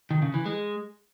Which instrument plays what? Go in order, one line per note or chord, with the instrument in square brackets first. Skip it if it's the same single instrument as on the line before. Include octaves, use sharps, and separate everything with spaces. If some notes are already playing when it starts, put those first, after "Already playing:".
[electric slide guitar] D#3
C#3
E3
G#3